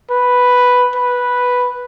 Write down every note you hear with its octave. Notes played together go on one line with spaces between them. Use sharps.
B4
B4